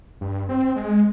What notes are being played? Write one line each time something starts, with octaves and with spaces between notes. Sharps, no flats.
G2
C4
G#3